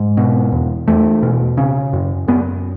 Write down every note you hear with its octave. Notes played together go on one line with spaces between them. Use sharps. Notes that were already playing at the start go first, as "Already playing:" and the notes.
Already playing: G#2
B2
E2
E2 A3
B2
C#3
F#2
F#2 B3